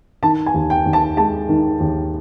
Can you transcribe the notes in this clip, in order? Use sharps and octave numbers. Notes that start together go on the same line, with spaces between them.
D#3 A5
G#5
D#2
G5
D#2
A5
G#3 A5
D#3
D#2